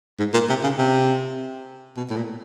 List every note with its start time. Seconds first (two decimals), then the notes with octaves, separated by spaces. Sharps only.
0.19 G#2
0.34 A#2
0.49 C3
0.64 C#3
0.78 C3
1.97 B2
2.10 A2
2.16 A#2